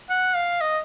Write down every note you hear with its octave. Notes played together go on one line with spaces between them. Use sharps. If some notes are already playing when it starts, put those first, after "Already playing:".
F#5
F5
D#5